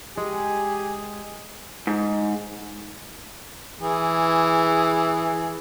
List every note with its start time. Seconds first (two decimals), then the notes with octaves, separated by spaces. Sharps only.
0.17 G#3 G4 G#4 G#5
1.87 G#2
3.81 E3 G#4